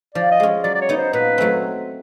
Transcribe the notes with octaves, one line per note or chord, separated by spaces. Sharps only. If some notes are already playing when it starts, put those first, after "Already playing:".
F3 D5
D#5
G#3 C#4
F#3 D5
D5
C#5
B3 D#4
C5
A#2 B4
F#3 A3 C4